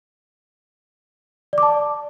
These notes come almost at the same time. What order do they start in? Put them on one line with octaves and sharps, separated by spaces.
D5 D6 A5